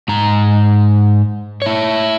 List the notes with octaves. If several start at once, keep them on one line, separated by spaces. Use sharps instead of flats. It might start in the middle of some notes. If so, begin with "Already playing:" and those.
G#2 A#5
E4 C#5